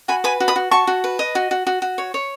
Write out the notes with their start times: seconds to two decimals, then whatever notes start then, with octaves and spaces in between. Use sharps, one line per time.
0.08 F#4 G#5 B5
0.24 B4 G#5 B5
0.40 F#4
0.48 B5 D#6
0.56 F#4
0.71 F#4 A5 C#6
0.87 F#4
1.04 B4
1.19 D#5
1.35 F#4
1.51 F#4
1.67 F#4
1.82 F#4
1.98 C#5
2.14 C#5